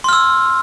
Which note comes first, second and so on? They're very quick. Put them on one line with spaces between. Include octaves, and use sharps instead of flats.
C6 F6 E6